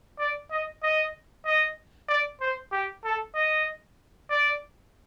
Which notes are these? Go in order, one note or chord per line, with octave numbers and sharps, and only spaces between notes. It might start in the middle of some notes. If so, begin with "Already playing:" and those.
D5
D#5
D#5
D#5
D5
C5
G4
A4
D#5
D5